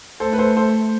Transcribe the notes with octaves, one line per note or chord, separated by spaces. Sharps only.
A3 A4 C5
B4
A4 C5
A4 C5